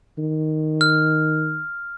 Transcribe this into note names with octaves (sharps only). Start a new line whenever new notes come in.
D#3
F6